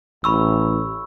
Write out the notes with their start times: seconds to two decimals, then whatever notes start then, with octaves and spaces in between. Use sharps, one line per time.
0.24 A1 B5 C#6 E6